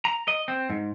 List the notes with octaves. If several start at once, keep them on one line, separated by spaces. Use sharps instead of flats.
A#5
D#5
C4
G#2